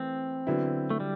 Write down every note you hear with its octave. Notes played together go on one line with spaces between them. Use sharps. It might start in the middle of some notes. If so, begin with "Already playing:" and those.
Already playing: E3 A3 C4 E4
D3 F#3 B3 E4
A3
G3